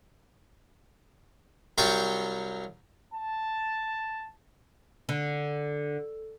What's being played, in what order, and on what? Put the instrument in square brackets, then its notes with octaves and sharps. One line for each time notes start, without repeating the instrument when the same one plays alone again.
[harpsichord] C2 F#3 F4 C5 G5 C#6
[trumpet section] A5
[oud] D3